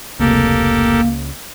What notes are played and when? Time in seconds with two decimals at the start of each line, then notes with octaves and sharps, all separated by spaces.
0.19 F1 C#2 A#3 G4 A4 A#4